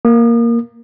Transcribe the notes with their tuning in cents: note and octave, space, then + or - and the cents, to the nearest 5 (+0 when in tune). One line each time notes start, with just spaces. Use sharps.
A#3 +0 D#6 -40